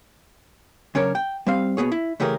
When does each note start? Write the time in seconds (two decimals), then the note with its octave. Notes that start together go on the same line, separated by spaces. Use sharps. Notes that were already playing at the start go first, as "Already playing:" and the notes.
0.95 C#3 F#3 C#4 D4 A#4 C#5
1.15 G5
1.47 G3 C4 F5
1.77 B2 E3 B3 G#4 C#5
1.92 E4
2.20 C#3 E3 A3 G4 G#4 A#4